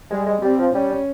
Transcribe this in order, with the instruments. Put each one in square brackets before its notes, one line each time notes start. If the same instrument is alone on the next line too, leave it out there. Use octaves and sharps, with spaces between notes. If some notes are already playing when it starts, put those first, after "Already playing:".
[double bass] G3 [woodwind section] G#3
[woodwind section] G#3
[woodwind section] G3 [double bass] C4
[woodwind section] F3
[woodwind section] G3 [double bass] C#4